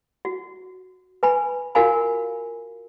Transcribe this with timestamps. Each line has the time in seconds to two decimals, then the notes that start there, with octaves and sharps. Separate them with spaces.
0.25 F#4
1.23 B4 G#5 B5
1.75 F4 F#4 A#4 F5 G#5 B5